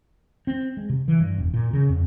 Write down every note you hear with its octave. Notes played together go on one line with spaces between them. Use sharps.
C4
G#3
C3
E3
G2
E1
A#2
C#3
F2